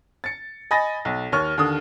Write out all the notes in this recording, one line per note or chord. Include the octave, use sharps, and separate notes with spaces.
A6 C#7
D#5 G#5 B5 A6 A#6
B1
D#2 C#5 C#6 F6
D#2 D3 D#6